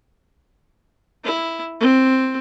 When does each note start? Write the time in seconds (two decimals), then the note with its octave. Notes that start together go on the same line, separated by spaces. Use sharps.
1.24 E4
1.81 C4